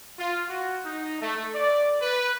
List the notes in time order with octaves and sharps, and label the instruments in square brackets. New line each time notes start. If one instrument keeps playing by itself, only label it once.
[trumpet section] F4
F#4
D#4
A3
D5
B4